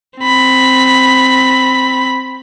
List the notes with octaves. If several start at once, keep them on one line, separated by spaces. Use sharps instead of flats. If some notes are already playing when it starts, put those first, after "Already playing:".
C4 B5